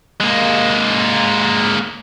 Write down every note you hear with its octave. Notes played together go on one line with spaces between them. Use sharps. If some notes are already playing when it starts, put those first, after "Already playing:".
G#3 A#3